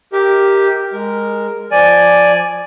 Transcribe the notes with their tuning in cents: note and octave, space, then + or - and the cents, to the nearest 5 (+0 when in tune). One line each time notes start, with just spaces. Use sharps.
G4 +0 A#4 +0 D#5 +45
G#3 -10 A#4 +0
F3 +0 D5 +0 G#5 +0